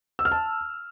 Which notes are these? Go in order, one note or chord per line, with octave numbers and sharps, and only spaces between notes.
E6
F6
A5